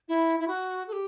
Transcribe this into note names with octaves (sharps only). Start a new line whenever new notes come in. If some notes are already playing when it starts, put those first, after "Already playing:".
E4
E4
F#4
A4
G4